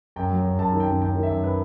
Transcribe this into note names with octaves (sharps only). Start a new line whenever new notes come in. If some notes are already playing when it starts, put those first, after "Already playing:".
F#2 G5
F#3
F#2
F#2 A5
D#3
G5
F#2
F#2 G5
D#3
E5
F#2
B4